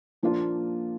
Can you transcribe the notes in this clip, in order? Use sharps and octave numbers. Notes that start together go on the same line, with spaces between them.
A#2 F3 A#3 D4 F4